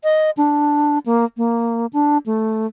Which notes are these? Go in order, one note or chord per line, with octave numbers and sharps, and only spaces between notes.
D#5
D4
A#3
A#3
D4
A3